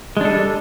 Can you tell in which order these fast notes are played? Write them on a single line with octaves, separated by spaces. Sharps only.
G#3 D4 A4 G3